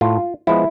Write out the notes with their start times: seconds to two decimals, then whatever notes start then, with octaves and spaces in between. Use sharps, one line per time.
0.01 A2 F4
0.47 F3 G#3 B3 E4